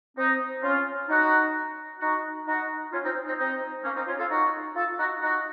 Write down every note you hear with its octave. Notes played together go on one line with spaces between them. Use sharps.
C4 D#4
C#4 F4
D#4 F#4
D#4 F#4
D#4 F#4
C#4 F4
C4 D#4
C4 D#4
C4 D#4
A#3 C#4
C4 D#4
C#4 F4
F4 A4
D#4 F#4
F4 A4
D#4 F#4
D#4 F#4